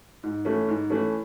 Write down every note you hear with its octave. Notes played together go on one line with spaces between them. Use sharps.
G#2
E3 A3 C#4
G#2
E3 A3 C#4